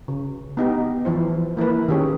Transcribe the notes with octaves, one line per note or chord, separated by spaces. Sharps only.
C#3
B3 D#4 G4
E3 F3 E4 C5
A#3 E4 A#4 B4
D#3 C#4 G4 G#4 C#5